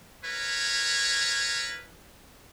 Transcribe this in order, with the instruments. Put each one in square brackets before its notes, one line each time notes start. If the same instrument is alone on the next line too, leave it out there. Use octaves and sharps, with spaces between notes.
[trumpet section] E4 A#4 B4 C#5